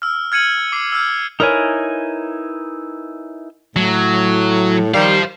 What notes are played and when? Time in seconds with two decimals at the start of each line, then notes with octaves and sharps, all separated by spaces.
0.02 E6 F6
0.32 F6 G#6 C#7 D#7 F#7
0.72 D6 C7 C#7
0.92 E6 F6 G6
1.40 D#4 E4 A#4 B4 C#5 G#5
3.76 A2 F#3
4.94 D#3 G3 C5 F5